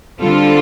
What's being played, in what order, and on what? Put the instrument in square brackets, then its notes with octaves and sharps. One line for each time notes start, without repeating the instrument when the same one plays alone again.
[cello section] D3 G3 C4 F4 A4